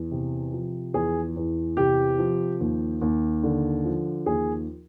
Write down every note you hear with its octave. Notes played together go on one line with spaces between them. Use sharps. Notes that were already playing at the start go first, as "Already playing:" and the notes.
Already playing: E2
C3
F3
E2 G#4
E2
C3 G4
F3
D#2
D#2
D3
F3
D#2 G#4